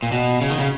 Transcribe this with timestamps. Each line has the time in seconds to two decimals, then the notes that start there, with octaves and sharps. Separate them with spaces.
0.03 A#2
0.12 B2
0.41 C#3
0.50 D#3
0.59 C#3